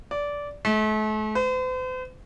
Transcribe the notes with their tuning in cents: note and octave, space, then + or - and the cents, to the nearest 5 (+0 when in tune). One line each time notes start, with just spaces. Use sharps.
D5 -15
A3 -40
C5 -45